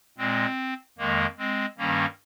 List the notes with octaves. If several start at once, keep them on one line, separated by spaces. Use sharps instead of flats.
A#2 G#3 C4
F2 D#3 G#3 A#3
G#3 C4
G2 D#3 G3 A#3 C#4